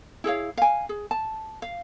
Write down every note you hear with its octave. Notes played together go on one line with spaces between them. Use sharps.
E4 G#4 C#5 F5
F5 G#5
G#4
A5
F5